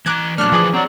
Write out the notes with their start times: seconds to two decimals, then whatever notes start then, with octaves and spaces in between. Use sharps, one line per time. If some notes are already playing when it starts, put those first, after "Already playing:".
0.06 E3 A5 A#5 D6 F#6 G#6
0.38 A#2 F#3 A3 D4 F6 F#6
0.52 D3 E3 F3 G#4 B4 D6
0.73 F#3 C4 D5